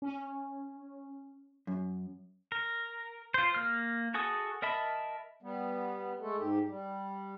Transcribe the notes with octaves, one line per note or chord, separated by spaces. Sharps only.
C#4
F#2
A#4
F4 C5
A#3 F6
F#4 G#4 A4 D#6
A#4 D#5 E5 A5 B5
G3 B3
G#3 A3 A4
G#2 G4
G3